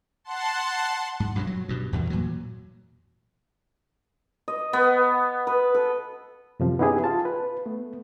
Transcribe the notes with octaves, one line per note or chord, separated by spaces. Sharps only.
F#5 A5 C6
G#2
G2 B2 D3 F#3
F#3
G2 B2
E2 G2 B2 D#3
A#2 E3 F#3
D#5
B3
B4
A4
F#2 C3 F3
B3 C#4 D#4 E4 G4 G#4
F4 A5
B4
A3 B3